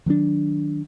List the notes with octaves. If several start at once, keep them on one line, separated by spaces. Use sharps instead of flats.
D#3 F#3 A3 D4